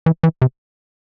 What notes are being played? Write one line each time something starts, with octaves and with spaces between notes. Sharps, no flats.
E3
E3
C3